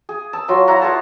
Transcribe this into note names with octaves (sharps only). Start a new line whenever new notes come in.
G#4
A5 E6
F#3 F4 C6
E4 D5 F#5 A#5
F4 G#4 C#5 A5